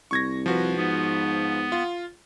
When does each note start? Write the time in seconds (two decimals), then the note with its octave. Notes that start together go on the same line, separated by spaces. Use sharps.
0.11 C2 C#6 G#6 A#6
0.46 F3 F#4 B4
0.77 G#2 B3
1.72 F4